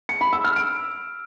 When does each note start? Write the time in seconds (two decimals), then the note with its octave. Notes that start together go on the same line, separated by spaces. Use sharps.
0.09 C#7
0.21 B5
0.33 E6
0.44 F6
0.56 D7